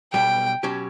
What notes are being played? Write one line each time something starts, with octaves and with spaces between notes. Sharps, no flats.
B1 B2 G3 G5
B2 F#3 C#4 G4